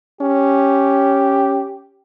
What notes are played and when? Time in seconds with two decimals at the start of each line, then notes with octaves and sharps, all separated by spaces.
0.21 C#4 G4